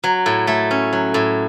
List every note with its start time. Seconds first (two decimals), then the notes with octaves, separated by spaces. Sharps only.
0.04 F#3
0.26 A2
0.47 A3
0.71 C#4
0.93 F#3
1.14 A2